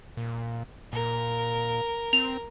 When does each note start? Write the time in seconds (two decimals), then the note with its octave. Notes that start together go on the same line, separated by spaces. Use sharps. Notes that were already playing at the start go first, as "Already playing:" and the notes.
0.17 A#2
0.93 A#2 A#4
2.13 C4 F7